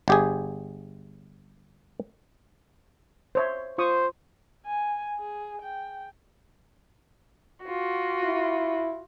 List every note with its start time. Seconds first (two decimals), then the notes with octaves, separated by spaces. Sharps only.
0.08 G1 G4 G#4
3.35 C5 C#5 E5
3.78 F4 C5 C#6 D#6
4.66 G#5
5.18 G#4
5.62 G5
7.63 F4 F#4
8.24 E4